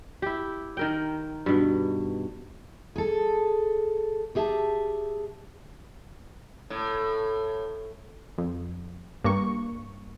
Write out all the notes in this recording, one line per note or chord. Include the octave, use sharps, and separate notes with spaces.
E4 G4
D#3 A#4 G5
G2 B2
G#4 A4
G4 G#4 E5 F5 A5
A2
F2
G2 A#3 C#6